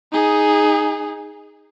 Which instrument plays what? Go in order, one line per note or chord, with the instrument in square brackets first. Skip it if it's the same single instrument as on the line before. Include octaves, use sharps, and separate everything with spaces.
[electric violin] D#4 G#4